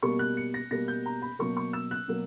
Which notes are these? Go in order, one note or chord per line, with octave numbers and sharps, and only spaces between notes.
B2 G3 A#3 C#6
F#6
C#7
A#6
B2 G3 A#3 A#6
G6
A#5
B5
B2 F#3 A#3 C#6
C#6
E6
F#6
B2 F#3 A#3